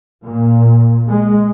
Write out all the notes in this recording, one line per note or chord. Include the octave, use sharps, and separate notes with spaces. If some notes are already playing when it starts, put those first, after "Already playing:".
A#2
G#3